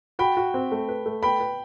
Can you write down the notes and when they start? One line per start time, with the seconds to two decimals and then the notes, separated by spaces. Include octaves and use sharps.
0.19 F#4 G5 B5
0.37 F#4
0.54 C4
0.72 A3
0.89 B4
1.06 A3
1.23 B4 G5 B5
1.40 B4